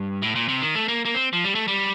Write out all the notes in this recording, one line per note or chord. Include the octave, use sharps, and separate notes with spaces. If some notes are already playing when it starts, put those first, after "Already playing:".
Already playing: G2
A2
A#2
C3
D#3
A3
A#3
A#3
C4
F3
G3
A3
G3